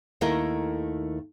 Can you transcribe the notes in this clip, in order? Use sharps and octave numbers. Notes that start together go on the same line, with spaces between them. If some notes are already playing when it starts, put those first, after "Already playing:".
D#2 D#3 A3 E4 A#4 D#5